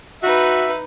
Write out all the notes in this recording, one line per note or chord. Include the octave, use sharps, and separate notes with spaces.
D#4 F#4 B4 E5